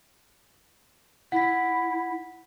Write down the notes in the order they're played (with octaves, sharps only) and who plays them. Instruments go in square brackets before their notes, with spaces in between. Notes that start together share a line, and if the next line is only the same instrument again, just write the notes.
[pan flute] E4 [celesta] F#5 B6